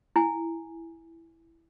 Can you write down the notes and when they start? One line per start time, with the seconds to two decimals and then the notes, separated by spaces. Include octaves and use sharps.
0.16 E4 G#5